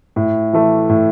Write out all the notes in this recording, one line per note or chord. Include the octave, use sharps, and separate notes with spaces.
A2
E3 A3
A2